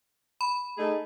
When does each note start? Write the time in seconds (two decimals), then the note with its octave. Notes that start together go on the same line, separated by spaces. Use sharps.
0.41 B5
0.78 A3 D#4 G#4